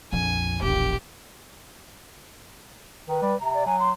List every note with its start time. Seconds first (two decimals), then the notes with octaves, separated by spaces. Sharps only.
0.12 A#1 F2 G#5
0.62 E1 A#1 G4
3.09 D#3 B4
3.22 G3
3.40 C3 A#5
3.54 D5
3.66 F#3 G#5
3.80 C6